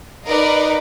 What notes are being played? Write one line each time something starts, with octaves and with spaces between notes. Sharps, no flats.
D#4 A#4 B4 D5 D#5 F5